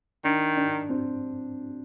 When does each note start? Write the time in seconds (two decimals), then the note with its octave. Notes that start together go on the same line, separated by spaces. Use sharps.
0.24 D#3 D4
0.57 D4
0.89 C4